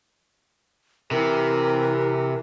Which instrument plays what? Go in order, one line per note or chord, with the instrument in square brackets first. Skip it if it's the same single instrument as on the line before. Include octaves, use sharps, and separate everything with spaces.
[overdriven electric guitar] C3 [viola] E3 [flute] A#4